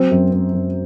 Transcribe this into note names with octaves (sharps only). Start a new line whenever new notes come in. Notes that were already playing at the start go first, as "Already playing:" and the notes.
Already playing: F#3 C4 C5
F#2
C4
F#2